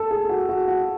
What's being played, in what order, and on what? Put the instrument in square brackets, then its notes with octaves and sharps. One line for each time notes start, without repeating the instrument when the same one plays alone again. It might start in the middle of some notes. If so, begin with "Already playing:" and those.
Already playing: [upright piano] A4
G#4
F#4
F#4
F#4